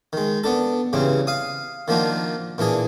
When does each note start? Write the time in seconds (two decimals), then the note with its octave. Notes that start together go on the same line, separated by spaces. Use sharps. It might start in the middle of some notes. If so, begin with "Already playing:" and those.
0.13 D#3 G#3
0.44 B3 D4 A4
0.93 G2 C#3 E3 C4
1.27 F5 D#6
1.88 D#3 F3 A#3 D4 F4 F#4
2.58 A#2 E3 D4 G#4